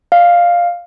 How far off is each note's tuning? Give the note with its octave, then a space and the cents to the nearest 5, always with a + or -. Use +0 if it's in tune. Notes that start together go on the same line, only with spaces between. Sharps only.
D5 +20 F5 +0